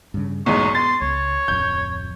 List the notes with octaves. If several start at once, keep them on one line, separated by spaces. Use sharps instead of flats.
G2 C#3
B1 E2 G#2 B3 C#6
C6 A6
C#2 C#5
D1 F2 G6